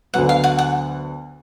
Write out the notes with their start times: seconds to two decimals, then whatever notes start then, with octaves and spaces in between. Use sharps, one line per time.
0.14 D2 D3 F#3 B3 F#5
0.29 F5
0.44 F#5
0.59 F#5